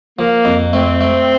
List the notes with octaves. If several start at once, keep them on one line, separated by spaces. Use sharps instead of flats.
F3 A#3
F2
A3 C4
A3